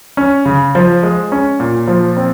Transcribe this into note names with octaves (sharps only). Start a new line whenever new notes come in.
C#4
C#3
F3
G#3
C#4
A#2
F3
C4